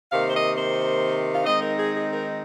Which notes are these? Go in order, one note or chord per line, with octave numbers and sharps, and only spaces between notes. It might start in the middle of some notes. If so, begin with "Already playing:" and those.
C3 D#3 A#3 F5
C5
D#5
C5
F5
D#3 G#3 C4 D#4 D#5
A#4
G#4
G#4
A#4